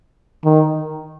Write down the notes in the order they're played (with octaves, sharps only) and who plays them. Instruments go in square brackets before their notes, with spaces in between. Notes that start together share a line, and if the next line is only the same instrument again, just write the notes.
[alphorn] D#3